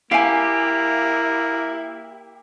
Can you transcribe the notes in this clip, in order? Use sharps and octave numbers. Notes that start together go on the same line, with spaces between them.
A#3 E4 G4 F5 G#5